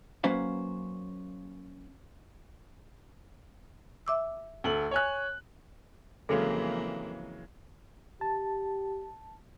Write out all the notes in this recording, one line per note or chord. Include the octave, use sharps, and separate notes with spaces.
F#3 A#3 C#4 B4 C5 F5
E5 D6 E6
D2 A4 F#7
C#5 G#5 F#6
F2 C#3 E3 F#3 G#3 A#3 A4
G4 A5